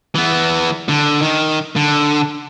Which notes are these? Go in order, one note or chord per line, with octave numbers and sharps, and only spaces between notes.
E3 B3
D3
D#3
D3